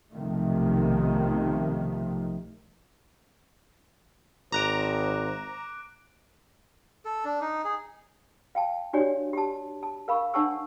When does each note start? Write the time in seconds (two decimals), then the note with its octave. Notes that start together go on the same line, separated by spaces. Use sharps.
0.11 B1 C3 D#3 F3 A3
4.52 G#1 C5 A#5 D6 F#6 D7
7.05 A4
7.25 D4
7.42 D#4
7.65 G#4
8.55 F5 G5 A5
8.93 D4 F#4 G4 C#5 D5 G#5
9.33 G4 A5
9.83 A5
10.08 A#4 F5 B5 C#6
10.34 D4 C5 F#5 A5 C#6 E6